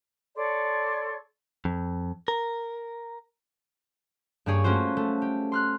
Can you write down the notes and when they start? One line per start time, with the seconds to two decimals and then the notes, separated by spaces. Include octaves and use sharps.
0.36 A4 C#5 D5 C6
1.65 F2
2.28 A#4
4.46 G2 A#3 G4 G#4 C#5
4.64 A3 A#3 C#4 F4 F#4 C5
4.97 A3
5.22 G4
5.52 C6 F6 F#6